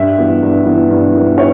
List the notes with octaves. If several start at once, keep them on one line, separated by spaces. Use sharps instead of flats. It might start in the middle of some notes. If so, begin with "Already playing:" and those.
Already playing: G2 E5
E3 B3
G2
E3 B3
G2
E3 B3
C#5